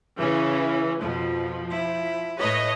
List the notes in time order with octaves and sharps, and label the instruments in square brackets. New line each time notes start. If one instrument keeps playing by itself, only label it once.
[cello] C#3 [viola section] E3 C#4
[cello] F2 B2 [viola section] F3
[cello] E4
[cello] A2 B4 [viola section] C#5 D#5